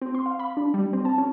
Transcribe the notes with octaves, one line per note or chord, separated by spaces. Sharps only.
C4
C6
F5
B5
D4
G3
C4
A5
C#4